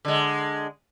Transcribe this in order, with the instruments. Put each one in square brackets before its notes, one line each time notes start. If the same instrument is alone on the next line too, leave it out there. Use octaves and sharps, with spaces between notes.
[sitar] D3 G#3